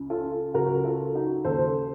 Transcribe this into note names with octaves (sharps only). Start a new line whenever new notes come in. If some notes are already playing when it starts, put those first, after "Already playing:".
Already playing: C#2 C#3
F4 A4
C#2 C#3 F#3 F#4 A#4
F4 A4
D#4 F#4
D#2 C#3 F#3 A4 C5